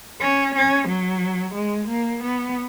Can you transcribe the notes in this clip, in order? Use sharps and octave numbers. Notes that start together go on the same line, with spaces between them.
C#4
C#4
F#3
G#3
A#3
B3